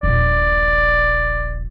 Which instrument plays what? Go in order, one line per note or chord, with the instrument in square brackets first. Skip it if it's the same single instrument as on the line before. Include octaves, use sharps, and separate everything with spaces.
[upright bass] D#1 A#1 [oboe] D5